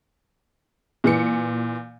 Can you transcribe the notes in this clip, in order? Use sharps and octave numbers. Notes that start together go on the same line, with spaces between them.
A#2 E3 C#7